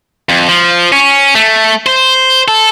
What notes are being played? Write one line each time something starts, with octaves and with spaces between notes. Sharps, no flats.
F2
F3
C#4
A3
C5
A4